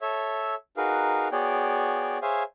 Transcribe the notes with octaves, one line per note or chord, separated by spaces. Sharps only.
A4 C#5 E5
D#4 F#4 G#4 A#4 B4 F5
B3 F#4 G#4 C#5 D5 G5
G#4 C5 C#5 E5 F5 G#5